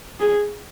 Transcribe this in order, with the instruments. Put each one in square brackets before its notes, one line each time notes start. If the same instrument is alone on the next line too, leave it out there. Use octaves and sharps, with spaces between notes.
[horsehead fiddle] G#4